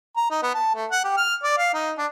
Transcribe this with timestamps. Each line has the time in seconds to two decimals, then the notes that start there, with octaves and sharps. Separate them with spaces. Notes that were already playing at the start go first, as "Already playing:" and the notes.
0.17 A#5
0.31 D#4
0.43 B3
0.55 A5
0.75 A3
0.91 F#5
1.04 G4
1.17 F6
1.43 D5
1.58 F5
1.74 D#4
1.98 D4